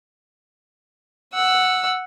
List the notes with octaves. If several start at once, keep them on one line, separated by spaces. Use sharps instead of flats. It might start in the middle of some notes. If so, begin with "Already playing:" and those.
F#5 E6